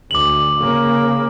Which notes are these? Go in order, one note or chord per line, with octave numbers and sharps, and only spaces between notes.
D2 D6 F#7
C#3 A#3